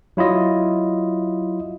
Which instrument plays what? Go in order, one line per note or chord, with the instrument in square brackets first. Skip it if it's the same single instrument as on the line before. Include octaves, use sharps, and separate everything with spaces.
[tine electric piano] F#3 E4 F4 D#5